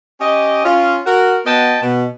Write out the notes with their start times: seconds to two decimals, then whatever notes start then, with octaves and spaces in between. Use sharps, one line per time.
0.21 C#4 G4 D#5
0.65 C#4 F4
1.07 F#4 A#4
1.46 B3 F#4 D#5 G5 A5
1.82 B2